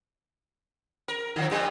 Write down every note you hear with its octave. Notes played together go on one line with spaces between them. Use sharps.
A#4
D3 F3
G2 G3